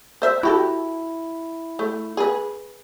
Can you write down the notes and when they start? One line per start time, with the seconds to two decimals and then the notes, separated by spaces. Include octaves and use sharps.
0.22 C5 E5
0.43 E4 F#4 G4 A4
1.79 A3
2.17 G#4 B4